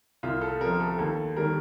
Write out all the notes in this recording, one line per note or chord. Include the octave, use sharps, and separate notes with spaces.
C2 F4
A4
C3 F3 A#4
A4
D#2 A4
D#3 G3 A#4